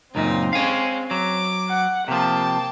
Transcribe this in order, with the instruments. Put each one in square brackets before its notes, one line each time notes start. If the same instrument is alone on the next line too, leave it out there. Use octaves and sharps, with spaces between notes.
[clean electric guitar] C#2 F#2 A#2 [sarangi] C4 [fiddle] D#4
[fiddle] G#3 C#4 [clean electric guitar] F5 G#5
[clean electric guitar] F#3 [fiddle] D6
[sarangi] F#5
[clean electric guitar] C3 F3 [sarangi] A#3 [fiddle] G5 A5